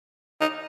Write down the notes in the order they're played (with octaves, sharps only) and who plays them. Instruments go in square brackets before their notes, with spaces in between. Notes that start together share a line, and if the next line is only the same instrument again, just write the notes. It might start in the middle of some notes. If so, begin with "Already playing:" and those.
[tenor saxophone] D#4